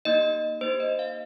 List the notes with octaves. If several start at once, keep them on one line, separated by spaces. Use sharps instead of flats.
A#3 D#4 G4 D#5
A#3 D#4 G4 C5
D#5
F5